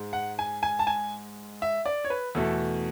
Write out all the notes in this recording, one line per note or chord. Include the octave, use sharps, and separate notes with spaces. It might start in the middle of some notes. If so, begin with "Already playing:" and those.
Already playing: G#2 G#3
F#5
G#5
G#5
A5
G#5
E5
D5
C#5
B4
E2 B2 A3 A4